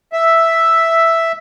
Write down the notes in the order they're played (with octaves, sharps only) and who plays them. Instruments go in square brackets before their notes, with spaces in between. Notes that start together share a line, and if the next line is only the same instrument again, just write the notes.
[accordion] E5